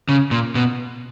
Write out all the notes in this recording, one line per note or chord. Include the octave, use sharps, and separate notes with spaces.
C#3
A#2
B2